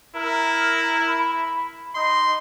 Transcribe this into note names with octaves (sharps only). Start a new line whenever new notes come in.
E4 A#4
B5
D#4 C6